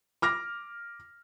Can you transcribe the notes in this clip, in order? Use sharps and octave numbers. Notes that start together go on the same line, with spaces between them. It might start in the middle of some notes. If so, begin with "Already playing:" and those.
D6 F6 A#6